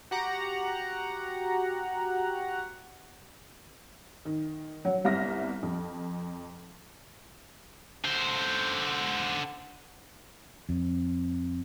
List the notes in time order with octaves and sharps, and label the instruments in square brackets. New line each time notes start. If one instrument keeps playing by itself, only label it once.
[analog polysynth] F#4 G4 F#5 A#5
[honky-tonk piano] D#3
F#3
G1 C2 F6 A#6
F2
[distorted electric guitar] D3 C5
[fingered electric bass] F2